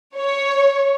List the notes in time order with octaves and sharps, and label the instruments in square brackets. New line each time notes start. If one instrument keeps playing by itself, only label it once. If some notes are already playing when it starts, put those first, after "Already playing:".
[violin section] C#5